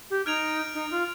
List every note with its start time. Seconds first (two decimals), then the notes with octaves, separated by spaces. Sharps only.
0.10 G4
0.26 D#4 F6 G#6 D7 F7
0.74 D#4
0.91 F4